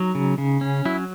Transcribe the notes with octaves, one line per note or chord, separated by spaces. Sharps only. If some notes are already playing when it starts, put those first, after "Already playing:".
Already playing: F#3 D#4
C#3
C#3
C#4
F#3 E4